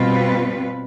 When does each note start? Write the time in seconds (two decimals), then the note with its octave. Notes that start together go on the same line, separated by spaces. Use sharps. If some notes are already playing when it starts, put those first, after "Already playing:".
Already playing: B2 G3 C4 F4 B4